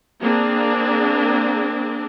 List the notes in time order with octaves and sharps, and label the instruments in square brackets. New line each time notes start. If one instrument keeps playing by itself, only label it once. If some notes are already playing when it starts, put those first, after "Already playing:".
[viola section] A#3 C4 D4 G#4